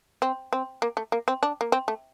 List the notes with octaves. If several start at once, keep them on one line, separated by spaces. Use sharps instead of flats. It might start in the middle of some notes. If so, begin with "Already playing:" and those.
C4
C4
A#3
A3
A#3
C4
D4
A#3
C4
A3